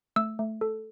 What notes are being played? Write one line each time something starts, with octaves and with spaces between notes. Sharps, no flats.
A3 E6
A3
A4